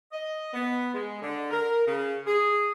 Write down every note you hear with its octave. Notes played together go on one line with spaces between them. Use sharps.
D#5
B3
G#3
D3
A#4
C#3
G#4